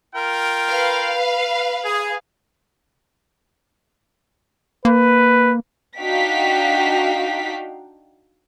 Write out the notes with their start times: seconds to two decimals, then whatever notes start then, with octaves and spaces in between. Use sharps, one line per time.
0.15 F4 A#4 G5
0.68 B4 F5
1.85 G#4
4.85 A#3 B4
6.00 D4 D#4 F#4 F5 G5 B6